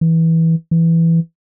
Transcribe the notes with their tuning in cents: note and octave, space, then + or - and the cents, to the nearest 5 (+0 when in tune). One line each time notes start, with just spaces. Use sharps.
E3 -15
E3 +5